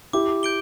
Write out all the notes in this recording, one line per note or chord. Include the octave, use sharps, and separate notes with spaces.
E4 G4 D6
G6 D7 G7